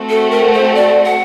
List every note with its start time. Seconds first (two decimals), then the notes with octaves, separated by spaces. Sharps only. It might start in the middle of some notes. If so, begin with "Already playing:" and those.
Already playing: A3 C4 F#4
0.09 A4
0.31 A#4
0.53 C5
0.75 D5
1.04 F#5